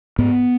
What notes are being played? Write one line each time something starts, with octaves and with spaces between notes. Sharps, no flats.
G#2 B3